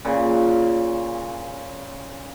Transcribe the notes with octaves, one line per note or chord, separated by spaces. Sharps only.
A#2 C#3